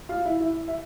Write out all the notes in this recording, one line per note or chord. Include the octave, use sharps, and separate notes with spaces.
F4 F5
E4 E5
E4 E5
E5